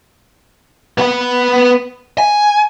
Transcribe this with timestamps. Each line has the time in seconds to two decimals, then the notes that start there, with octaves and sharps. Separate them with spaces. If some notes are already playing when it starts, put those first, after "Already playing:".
0.98 B3 F#5
2.18 G#5